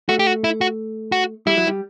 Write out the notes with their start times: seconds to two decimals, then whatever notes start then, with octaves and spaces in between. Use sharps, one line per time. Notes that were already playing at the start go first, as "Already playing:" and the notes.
0.09 A3 F#4
0.19 G4
0.27 F#4
0.44 E4
0.61 F#4
1.12 F#4
1.47 G3 E4
1.57 F#3
1.67 G3